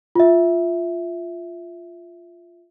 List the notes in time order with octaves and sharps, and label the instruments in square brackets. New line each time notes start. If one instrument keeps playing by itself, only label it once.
[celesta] F4 E5